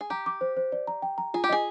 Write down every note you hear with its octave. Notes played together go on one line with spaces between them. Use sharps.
G#4
G4 A#5
D6
C5
C5
D5
A#5
G5
A#5
F4 G#4
G4
G#4 D#5